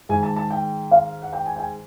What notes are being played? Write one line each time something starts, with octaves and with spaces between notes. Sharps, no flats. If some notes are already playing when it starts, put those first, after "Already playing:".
G#2 D#3 G#3 G#5
A5
A5
G5
F5
F#5
G5
G#5
G5
G#5